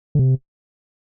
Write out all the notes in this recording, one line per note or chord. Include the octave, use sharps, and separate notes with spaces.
D3
C3